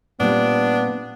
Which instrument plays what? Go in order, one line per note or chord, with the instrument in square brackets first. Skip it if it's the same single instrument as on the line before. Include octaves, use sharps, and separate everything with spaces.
[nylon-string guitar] A#2 G3 C4 [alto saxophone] B3 [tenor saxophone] D4